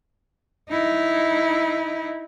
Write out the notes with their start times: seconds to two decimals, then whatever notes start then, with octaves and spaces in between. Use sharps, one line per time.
0.70 D#4 E4